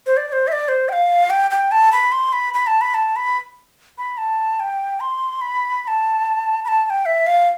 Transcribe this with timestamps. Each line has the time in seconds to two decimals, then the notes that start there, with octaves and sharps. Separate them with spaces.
0.06 C5
0.17 D5
0.28 D5
0.33 C5
0.47 E5
0.52 D5
0.68 C5
0.89 G5
0.93 F5
1.30 G5
1.51 G5
1.71 A5
1.92 B5
2.12 C6
2.33 B5
2.54 B5
2.67 A5
2.81 B5
2.94 A5
3.16 B5
3.98 B5
4.18 A5
4.60 G5
5.00 C6
5.41 B5
5.83 B5
5.88 A5
6.65 B5
6.68 A5
6.85 A5
6.90 G5
7.06 E5
7.27 F5